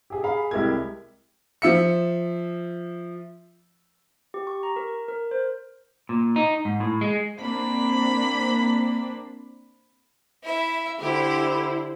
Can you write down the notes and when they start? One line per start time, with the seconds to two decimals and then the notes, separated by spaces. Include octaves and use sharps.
0.10 G4 G#4
0.23 G#4 F5 B5
0.51 C2 G#3 E4 G4 A#4 G#6
1.62 F3 E5 C#7
4.34 G4
4.47 C#6
4.63 A#5
4.76 A#4
5.08 A#4
5.31 C5
6.09 A#2
6.36 D#4
6.65 G#2
6.80 A2
7.01 G#3
7.40 A#3 C4 D4 B5
10.43 E4 E5
10.99 D3 E4 G4 C5